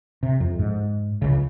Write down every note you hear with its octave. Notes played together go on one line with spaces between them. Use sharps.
C3
F2
G#2
C#2 C#3